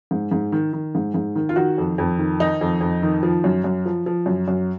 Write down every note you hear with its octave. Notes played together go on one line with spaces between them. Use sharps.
G#2
G#2
D#3
D#3
G#2
G#2
D#3
F4
D#3 F#4
F2
F2
D#3
D#3 D#4
F2
F2
D#3
F3
F#2
F#2
F3
F3
F#2
F#2